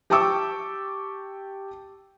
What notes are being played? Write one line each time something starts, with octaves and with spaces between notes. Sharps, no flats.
G4 G5 A5 C#6 D6 E6